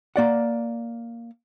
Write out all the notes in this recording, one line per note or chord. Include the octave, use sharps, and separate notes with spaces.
A#3 D5 F#5